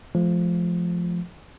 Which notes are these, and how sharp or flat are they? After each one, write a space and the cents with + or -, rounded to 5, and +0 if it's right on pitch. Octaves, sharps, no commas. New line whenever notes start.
F3 -5 A3 -40